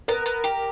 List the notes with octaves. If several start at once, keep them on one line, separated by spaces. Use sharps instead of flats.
B3 A#4
B3
G4